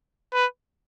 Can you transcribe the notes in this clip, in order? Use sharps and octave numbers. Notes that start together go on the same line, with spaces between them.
B4